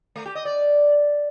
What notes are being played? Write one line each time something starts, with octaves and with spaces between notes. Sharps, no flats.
A3
G4
D#5
D5